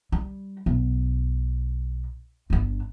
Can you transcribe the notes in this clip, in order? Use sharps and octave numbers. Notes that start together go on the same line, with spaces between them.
G3
B1
G1 D4